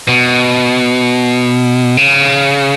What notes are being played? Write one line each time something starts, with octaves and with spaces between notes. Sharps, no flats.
B2
C#3